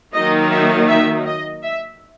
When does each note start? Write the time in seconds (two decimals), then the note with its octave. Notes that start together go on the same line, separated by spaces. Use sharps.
0.14 D#3 F#3 A#3 D#4 D#5
0.51 E5
0.88 E5
1.27 D#5
1.63 E5